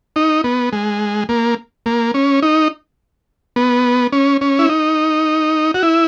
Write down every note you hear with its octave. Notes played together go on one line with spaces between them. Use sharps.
D#4
B3
G#3
A#3
A#3
C#4
D#4
B3
C#4
C#4
E4
D#4
F#4
E4